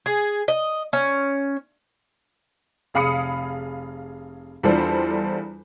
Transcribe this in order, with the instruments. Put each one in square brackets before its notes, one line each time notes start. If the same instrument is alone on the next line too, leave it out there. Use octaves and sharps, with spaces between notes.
[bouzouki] G#4
D#5
C#4
[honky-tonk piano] F1 G#4 F5 B5 D#6 C#7
E2 G3 D4 F4 A4 C5